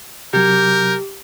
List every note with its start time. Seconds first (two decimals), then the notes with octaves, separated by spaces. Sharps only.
0.33 C3 F#3 G4 A#4 G6